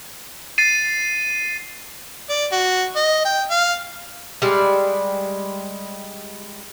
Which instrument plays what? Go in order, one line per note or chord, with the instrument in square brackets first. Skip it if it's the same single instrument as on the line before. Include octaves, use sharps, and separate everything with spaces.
[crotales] A6 C7 D#7
[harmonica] D5
F#4
D#5
G5
F5
[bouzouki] G3 G#3 D5